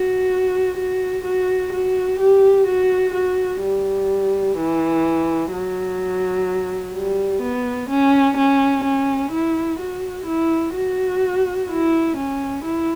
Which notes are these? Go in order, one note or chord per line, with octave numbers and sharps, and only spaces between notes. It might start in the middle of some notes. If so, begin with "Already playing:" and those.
Already playing: F#4
F#4
F#4
F#4
G4
F#4
F#4
G3
E3
F#3
G3
B3
C#4
C#4
C#4
E4
F#4
E4
F#4
E4
C#4
E4